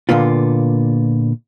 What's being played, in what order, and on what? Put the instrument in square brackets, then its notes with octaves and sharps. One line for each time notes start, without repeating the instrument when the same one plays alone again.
[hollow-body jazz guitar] A#2 D3 A#3 B3 F4